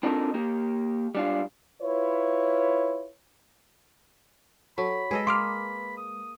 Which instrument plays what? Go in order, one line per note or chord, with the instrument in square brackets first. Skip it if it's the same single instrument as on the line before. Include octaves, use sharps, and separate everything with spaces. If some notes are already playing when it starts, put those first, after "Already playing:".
[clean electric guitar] C4 D4 D#4 F4 A4 A#4
A#3 G4
G3 D4 F4
[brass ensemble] E4 F4 B4 C#5
[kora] F#3 [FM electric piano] A4 [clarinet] B5
[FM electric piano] G#3 B4 [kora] G#4 A4 D#5
[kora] A#3 [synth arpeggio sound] C6 D6 F6
[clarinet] D#6